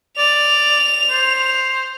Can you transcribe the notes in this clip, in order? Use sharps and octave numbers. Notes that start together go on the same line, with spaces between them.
D5 F7
C5